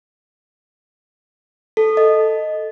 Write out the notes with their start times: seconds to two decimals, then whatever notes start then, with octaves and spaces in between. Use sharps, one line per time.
1.77 A4
1.97 D#5